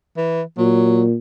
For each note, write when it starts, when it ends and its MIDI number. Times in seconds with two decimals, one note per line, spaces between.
0.17 0.42 52
0.58 1.15 46
0.58 1.04 54